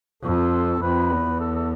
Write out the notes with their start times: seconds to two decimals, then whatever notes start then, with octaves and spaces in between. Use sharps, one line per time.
0.23 F2 A4
0.81 F2 B4
1.11 E2
1.40 A4
1.55 A4